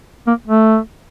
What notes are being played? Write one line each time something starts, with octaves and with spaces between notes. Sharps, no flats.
A#3
A3